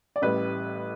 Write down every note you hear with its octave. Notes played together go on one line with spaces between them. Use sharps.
D5
A1 A2 G3 B4